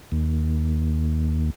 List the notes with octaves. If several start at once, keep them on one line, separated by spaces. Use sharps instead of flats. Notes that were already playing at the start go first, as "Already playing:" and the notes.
D#2